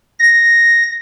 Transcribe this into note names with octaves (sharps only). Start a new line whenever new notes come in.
A#6